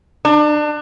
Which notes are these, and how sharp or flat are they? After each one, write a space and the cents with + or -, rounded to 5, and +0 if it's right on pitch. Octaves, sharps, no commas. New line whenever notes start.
D4 +30